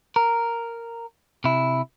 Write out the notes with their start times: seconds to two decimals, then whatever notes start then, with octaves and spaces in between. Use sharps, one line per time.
0.16 A#4
1.44 C3 E4